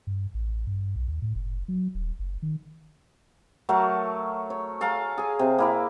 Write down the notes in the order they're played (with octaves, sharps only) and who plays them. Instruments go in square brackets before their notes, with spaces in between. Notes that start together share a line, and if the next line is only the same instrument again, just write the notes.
[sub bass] G2
A1
G2
B1
D#2
A2
F#1
F#3
D#1
F#1
D#3
[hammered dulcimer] F#3 A3 A#4 A5
C#5
A4 F5 G#5 A#5
G#4 G#5
C3
A#3 E4 D5